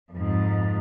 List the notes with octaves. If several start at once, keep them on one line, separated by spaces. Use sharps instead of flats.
F2 G#2